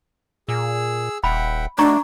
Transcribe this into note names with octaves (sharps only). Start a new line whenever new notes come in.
A#2 G#4 E6
D#1 E5 F#5 G5 B5
A3 D4 D#4 F#4 D5 A#5 C#6